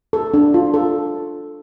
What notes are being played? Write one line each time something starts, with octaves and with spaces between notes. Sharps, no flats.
A4
D4
F4
A4